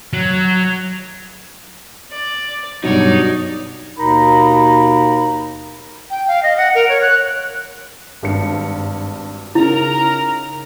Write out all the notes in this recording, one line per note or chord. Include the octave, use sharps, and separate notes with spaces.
F#3
D5
G2 B2 F#3 D#4 C#5 D5
D#2 B2 D#4 A#4 B5
G5
F5
D#5
F#5
A#4
C#5
F#6
G#1 G2 C#7
C#3 D#4 E4 A#4 A#5